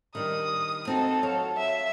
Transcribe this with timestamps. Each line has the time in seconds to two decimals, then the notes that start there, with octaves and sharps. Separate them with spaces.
0.15 D#3 G3 D4 D#6
0.87 C4 D#4 F#4 A4
1.23 F#3 C#5 F5
1.58 E5